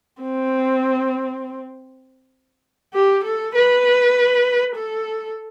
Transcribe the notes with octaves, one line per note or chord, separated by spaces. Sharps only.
C4
G4
A4
B4
A4